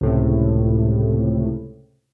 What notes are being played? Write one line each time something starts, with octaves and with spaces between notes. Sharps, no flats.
C#2 A2 C3